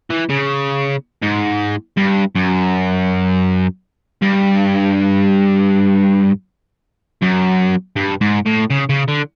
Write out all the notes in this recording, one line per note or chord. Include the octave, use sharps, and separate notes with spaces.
E3
C#3
G#2
G2
F#2
G2
F#2
G2
G#2
A2
C#3
C#3
D3